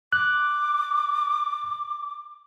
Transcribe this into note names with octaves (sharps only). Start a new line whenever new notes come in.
D6 F#6